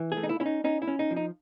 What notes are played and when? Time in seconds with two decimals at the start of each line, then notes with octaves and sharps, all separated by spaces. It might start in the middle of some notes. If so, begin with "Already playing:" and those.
Already playing: E3
0.12 G#4
0.17 A3
0.23 D#4
0.29 E4
0.40 C#4 E4
0.46 D#4
0.64 C#4 D#4
0.82 E4
0.88 C#4
0.99 D#4
1.11 F3
1.16 D#4